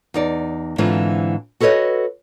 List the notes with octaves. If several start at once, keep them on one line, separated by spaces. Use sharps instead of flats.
E2 D#4 D5
G#2 D3 E3 C4 F4
F#4 A4 B4 C#5 D#5